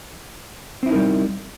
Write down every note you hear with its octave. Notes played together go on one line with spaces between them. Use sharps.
G3 C4 D#4 E4 A#4